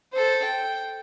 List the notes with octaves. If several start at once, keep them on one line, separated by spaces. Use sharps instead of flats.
A4 C5
G5